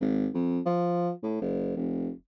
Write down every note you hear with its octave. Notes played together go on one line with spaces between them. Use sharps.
G#1
F2
F3
A2
F#1
F1